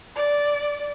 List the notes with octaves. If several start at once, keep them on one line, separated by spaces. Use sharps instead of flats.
D5